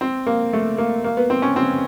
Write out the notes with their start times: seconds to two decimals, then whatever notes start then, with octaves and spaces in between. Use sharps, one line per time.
0.01 C4
0.26 A#3
0.53 A3
0.78 A#3
1.04 A#3
1.17 B3
1.30 C4
1.42 C#4
1.56 C4